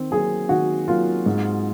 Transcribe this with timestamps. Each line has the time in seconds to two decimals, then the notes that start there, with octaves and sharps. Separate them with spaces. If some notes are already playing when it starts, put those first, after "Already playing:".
Already playing: D#3 C4
0.11 F#3 A#3 G#4
0.49 D#3 F#4
0.88 F#3 A#3 F4
1.26 G#2